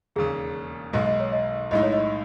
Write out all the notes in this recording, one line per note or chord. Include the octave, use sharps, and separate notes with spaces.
E1 D#2 C#3 G#4
B1 B2 G#3 D#5
D#5
C#5
D#5
B1 A2 G#3 D#4 D#5
C#5
D#5